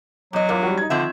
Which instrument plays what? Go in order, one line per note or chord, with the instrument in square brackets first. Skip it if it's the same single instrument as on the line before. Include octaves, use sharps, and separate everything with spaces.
[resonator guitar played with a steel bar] E2 D#5 [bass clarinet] F#3
[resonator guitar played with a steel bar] E2 G2 [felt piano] F4 A#4
[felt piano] G3 F#4
D#4 G#6
[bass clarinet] D3 [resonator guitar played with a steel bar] D#3 C4 E5 [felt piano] F3